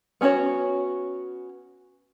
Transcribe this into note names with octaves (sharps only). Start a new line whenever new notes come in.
B3 C#4 D#4 F#4 C#5